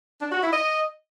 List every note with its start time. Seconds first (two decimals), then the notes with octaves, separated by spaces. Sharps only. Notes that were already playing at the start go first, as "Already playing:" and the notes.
0.21 D4
0.32 F#4
0.42 E4
0.52 D#5